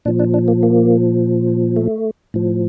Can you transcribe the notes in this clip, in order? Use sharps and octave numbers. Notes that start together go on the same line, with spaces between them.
A#2 F3 D4
D4
D4
A#3
A#3
A3
A2 F3